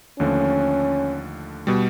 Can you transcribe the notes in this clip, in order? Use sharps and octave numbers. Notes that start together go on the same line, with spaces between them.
D#2 D3 F3 A3 C#4
B2 G3